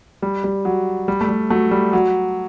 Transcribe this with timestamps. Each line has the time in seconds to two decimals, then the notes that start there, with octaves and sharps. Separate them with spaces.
0.22 G3
0.44 G3
0.65 F#3
1.08 G3
1.21 A3
1.29 G3
1.50 F#3 A3
1.71 G3
1.93 F#3